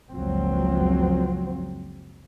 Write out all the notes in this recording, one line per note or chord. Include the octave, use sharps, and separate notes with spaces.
F#1 C#2 F#2 F3 F#3 C4